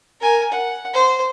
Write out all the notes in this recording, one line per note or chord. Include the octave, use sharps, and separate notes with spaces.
A#4 G#5
F#5
C5